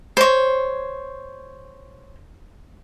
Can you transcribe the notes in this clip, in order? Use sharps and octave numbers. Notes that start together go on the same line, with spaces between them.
C5 C#5